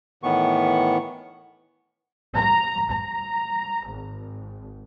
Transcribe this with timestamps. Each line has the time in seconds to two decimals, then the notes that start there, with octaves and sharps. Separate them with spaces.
0.23 A2 D#3 E3 B3 C#6
2.38 A#5
2.91 A#5
3.88 G#1